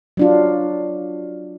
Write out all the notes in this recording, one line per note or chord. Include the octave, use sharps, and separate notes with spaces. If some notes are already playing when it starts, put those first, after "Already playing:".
F#3 D4 F4